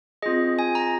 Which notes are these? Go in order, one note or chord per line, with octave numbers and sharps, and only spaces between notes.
C4 F4 G#4 D#5
G#5
A#5